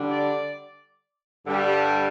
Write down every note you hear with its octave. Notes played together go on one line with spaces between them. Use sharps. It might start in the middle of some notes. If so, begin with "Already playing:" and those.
Already playing: D3 G3 D4
D5
G2 D3 G3 D4